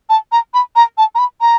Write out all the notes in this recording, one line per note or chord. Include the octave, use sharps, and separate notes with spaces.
A5
A#5
B5
A#5
A5
A#5
B5
A#5